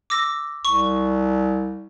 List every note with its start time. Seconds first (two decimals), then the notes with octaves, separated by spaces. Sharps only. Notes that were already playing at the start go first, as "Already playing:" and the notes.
0.10 D6 E6 A#6
0.65 C2 C#6